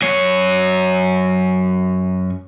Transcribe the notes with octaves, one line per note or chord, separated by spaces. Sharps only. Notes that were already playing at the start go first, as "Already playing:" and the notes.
F#2 C#5